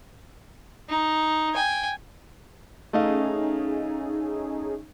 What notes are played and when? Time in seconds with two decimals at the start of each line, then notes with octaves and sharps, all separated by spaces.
0.89 D#4
1.54 G5 G#5
2.93 A3 C#4 D#4 G#4 D#5 F5